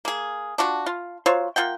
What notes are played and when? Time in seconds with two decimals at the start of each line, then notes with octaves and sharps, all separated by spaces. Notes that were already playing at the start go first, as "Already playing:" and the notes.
0.05 A#3 G#4
0.58 D4 F4 F#4
0.86 F4
1.26 F#3 F4 C5 C#5
1.56 A#3 F4 F#5 G5